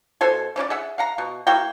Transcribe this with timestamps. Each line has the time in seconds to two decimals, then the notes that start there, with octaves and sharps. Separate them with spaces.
0.21 B2 A4 C5 G#5
0.56 E3 C#4 E4 D5
0.70 G#4 E5 F#5
0.98 F5 F#5 A#5
1.18 B2
1.47 A#3 E4 F#4 G5